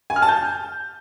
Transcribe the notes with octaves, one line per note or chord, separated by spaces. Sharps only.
G#5
F6
A5
G6